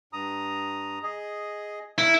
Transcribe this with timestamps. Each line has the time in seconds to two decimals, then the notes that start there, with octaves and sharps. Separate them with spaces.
0.13 G2 A#5 D#6
1.03 G#4 D#5
1.98 E2 E4 A#4